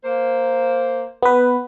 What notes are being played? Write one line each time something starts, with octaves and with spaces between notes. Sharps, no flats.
A#3 C5
B3 B4